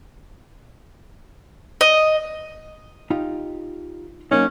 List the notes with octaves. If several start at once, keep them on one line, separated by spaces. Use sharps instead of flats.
D#5
D#4 F4 G4
F#3 A#3 C#4 D#4